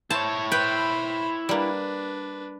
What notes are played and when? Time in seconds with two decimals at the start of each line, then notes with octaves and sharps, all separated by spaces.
0.10 E4 C5 C#5 A5
0.52 B4 C5 G5 B5
1.49 G3 A#3 D4 B4